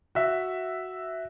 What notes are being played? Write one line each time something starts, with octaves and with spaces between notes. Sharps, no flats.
F#4 E5